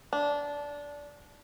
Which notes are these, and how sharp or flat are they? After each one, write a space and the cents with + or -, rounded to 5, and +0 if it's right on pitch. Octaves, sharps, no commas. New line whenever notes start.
D4 -15